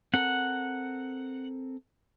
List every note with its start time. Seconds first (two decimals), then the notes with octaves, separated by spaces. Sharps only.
0.14 C4 A4 A#4 F#5